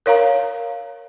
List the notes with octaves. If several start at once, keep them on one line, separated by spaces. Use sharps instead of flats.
A#4 C#5 F5 A#5